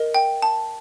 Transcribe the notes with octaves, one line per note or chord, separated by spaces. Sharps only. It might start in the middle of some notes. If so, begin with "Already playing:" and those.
Already playing: A#4 D#5
G5
A5